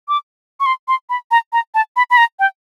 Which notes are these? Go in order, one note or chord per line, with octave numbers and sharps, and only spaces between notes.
D6
C#6
C6
C6
B5
A#5
A#5
A5
B5
B5
A#5
G5